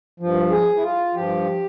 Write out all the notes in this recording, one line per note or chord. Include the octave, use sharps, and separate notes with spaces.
G2 F3
G#4
E4
F4
G2 F3 G4